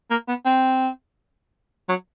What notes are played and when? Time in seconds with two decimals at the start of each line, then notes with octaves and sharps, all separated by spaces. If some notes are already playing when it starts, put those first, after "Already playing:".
0.10 A#3
0.28 B3
0.45 C4
1.89 F#3